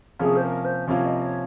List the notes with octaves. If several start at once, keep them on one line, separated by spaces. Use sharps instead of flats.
C3 F3 A#3 C#4 F4 G#4
C5
A#4
C5
C3 F3 A#3 C#4 F4 C#5
D#5
C#5